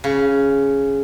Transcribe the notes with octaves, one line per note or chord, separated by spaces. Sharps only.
C#3